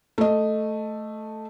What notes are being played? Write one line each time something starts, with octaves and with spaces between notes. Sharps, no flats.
A3 D#5